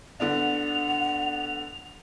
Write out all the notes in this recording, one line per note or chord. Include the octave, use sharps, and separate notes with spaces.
D3 B3 D4 F#5 F7